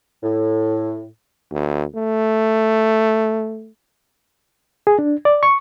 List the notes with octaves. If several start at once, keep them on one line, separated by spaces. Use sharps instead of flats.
A2
D2
A3
G#4
D4
D5
C#6